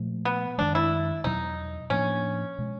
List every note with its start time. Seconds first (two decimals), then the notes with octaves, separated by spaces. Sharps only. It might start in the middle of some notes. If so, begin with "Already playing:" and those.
Already playing: A#2 F3 A3
0.25 B3
0.58 F#2 D#3 G#3 D4
0.75 E4
1.24 E2 B2 F#3 D#4
1.90 A2 F3 A#3 C#4 D4
2.58 B2 G#3